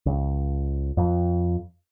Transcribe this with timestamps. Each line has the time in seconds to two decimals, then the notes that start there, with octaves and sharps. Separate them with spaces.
0.06 C#2
0.97 F2